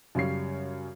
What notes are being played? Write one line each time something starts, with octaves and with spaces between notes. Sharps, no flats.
F#2 C#3 G3 C#5 C7